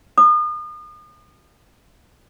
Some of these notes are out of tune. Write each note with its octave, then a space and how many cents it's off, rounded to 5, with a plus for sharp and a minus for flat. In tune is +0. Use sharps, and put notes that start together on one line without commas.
D#6 -40